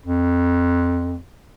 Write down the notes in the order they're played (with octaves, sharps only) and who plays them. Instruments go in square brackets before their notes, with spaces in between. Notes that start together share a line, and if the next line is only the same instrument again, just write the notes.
[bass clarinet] F2